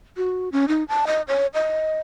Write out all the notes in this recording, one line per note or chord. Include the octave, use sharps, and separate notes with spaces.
F#4
C#4
D#4
A5
D#5
C#5
D#5